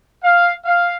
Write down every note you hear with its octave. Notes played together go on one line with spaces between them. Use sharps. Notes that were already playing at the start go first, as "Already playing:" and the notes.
F5
F5